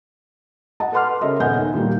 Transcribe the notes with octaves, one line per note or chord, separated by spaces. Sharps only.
D#5 F#5 A5
A4 B4 F#5 C6 D6 F6
C#3 A4 A#4 D#5 E5
D#1 B3 C#4 D#5 G#5 G6
D#4 A4
A#2 D#3 G3 A#3